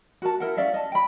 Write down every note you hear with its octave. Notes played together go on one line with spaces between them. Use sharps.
F#4 A#4 A5
E4 A#4 F#5
C#4 D5 E5 F5
D#5 A5
G5 B5